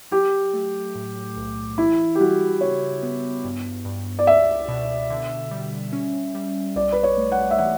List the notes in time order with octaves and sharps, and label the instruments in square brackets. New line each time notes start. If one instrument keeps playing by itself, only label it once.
[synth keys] F#3 [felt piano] G4
[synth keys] A3
A2
B1
[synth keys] E3 [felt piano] E4
[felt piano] G4
[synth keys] G3 [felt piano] F#4
[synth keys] C#3 [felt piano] C#5
[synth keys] B3
G2
G2
[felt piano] D5
[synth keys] C#2 [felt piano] E5
[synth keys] B2
D3
G3
C#4
G3
[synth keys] B1 [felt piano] D5
[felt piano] B4
C#5
[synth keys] A3
[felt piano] F#5
E5
[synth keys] E3 [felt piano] F#5